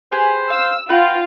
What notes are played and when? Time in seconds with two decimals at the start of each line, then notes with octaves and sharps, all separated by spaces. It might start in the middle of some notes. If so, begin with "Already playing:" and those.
0.12 G4 G#4 B4 C5
0.50 F5 E6
0.89 F4 F#4 B4 G5